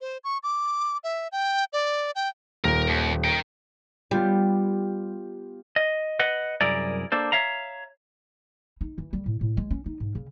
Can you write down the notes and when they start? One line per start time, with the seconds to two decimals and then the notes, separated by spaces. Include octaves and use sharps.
0.01 C5
0.24 C#6
0.43 D6
1.04 E5
1.32 G5
1.73 D5
2.15 G5
2.64 D#1 A#4
2.88 D#2
3.24 A#4 G5
4.11 G3 B3 F4 G4
5.76 D#5
6.19 B4 D#5 F#5
6.61 C2 F#2 E4 G#4 A#4 D5
7.12 A#3 D4 A4 C5
7.32 C#5 E5 F5 A#5
8.81 D#4
8.98 E3
9.13 G3
9.26 A2
9.41 A2
9.57 G#3
9.71 C#4
9.86 D#4
10.00 G#2
10.15 C#3